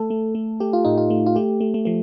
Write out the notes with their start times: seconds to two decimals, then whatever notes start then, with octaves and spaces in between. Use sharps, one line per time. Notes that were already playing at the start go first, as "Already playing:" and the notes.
Already playing: A3 A4
0.10 A3
0.35 A3
0.60 A3 G4
0.73 F4
0.85 A2 D#4
0.97 F4
1.10 A3
1.26 F4
1.36 A3 G4
1.61 A3
1.74 A3
1.85 F3 A3